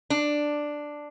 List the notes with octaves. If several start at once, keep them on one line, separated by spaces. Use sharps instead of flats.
D4